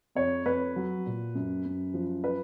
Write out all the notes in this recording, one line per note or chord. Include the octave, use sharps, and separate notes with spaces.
F2 C#5
F2 B4
F#3
A#2
F#2
F#2
F3
B4